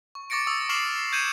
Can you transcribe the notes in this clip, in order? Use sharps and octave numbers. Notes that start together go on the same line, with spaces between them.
C#6
C#6 D6 A6 A#6 C#7 D7
C#6 D#6 E6 A6
C#6 D6 F6 C7 E7 F#7
G6 G#6 C#7 D#7 E7 F#7